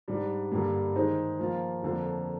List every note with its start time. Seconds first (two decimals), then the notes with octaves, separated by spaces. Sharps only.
0.08 G#2 G3 D4
0.52 G2 D3 G3 A#3
0.95 D#3 G#3 D#4 G#4 C5
1.39 F3 A#3 F4
1.83 F2 D3 F3 A#3